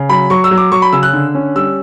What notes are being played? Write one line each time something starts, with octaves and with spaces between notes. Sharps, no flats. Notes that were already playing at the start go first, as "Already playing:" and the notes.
Already playing: C#3
F#3 B5
F#3 C#6
E6
F#3
D6
F#3 C#6
B5
C#3 E6
F#6
D3
C#4
G3 E6